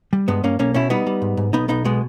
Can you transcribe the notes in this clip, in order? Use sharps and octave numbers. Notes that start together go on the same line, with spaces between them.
G3
G2 G#3 B3
G2 A#3 C#4
B1 A#3 C#4
B2 C#4 E4
G3 B3 D#4
G3
G#2
G#2
B1 B3 D#4
B1 B3 D#4
B2 G#3 B3